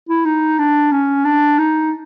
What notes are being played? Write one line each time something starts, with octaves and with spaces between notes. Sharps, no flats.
E4
D#4
D4
C#4
D4
D#4